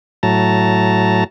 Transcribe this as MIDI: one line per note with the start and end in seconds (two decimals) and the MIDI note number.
0.23 1.24 45
0.23 1.24 54
0.23 1.24 81
0.23 1.24 82